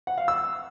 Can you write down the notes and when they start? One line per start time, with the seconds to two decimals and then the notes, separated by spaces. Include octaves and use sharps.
0.07 F#5
0.18 F5
0.28 E6